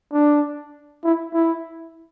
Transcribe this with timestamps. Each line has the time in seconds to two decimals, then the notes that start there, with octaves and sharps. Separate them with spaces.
0.13 D4
1.04 E4
1.34 E4